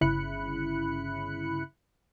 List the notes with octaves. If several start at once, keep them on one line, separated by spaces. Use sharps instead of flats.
G1 C#3 E4 B5 F#6 C#7